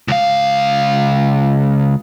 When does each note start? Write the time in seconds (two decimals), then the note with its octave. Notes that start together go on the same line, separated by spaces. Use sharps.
0.08 C#2 F5